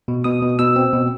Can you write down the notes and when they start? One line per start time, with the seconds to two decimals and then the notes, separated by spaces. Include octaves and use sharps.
0.08 B2
0.24 B2 D#6
0.42 B2
0.59 B2 E6
0.76 C4
0.93 B2